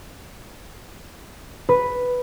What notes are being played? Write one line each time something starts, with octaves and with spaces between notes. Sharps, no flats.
B4